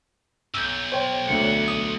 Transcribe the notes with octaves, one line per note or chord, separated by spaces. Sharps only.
B1 E6 G6
C5 C#5 G5
D2 F#5
D#6